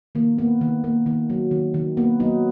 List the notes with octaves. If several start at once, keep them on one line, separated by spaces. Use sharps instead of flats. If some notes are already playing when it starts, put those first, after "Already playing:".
D#3 A#3
A#3 B3
D#3
A#3
D#3
F#3
D#3
D#3
A#3 B3
F#3 B3 D#4